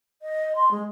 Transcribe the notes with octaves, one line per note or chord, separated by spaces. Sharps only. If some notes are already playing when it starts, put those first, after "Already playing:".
D#5
C6
G#3